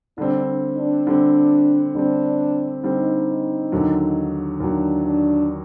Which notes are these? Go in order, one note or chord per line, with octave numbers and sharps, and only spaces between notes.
D3 G3 C4 D4
D4
D3 G3 C4
D3 G3 C4 D4
D3 G3 C4 D#4
D#2 D3 F#3
D#2 D3 F#3 D4
D4